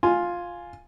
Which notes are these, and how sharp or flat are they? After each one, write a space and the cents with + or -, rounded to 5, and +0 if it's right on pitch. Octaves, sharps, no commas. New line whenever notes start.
F4 +5 G#5 +5